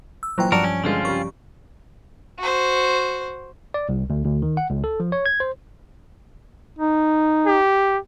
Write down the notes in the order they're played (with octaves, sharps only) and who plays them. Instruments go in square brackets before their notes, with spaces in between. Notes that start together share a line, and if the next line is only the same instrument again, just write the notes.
[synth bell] E6
[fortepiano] A#2 E3 [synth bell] F#3 G5 [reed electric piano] C5 A#5
[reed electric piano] G2 F3 [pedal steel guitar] F#4 A#4 [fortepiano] D5 [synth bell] A5 D7
[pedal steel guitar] C#4
[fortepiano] D3 G#3 [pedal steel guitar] C4 C#4 F4
[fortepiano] C#3 G3 [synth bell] C#6
[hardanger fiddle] F#4 C5
[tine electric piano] D5
C2
D2
D2
D#3
F#5
C#2
A4
F3
C#5
G#6
C5
[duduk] D#4
[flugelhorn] G4